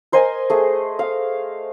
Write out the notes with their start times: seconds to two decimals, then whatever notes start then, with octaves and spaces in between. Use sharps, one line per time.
0.12 A#4 C5 D#5 G#5
0.50 A3 G#4
0.99 F5